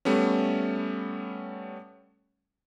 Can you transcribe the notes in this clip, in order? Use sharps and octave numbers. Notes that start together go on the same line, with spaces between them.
G3 A3 B3 C#4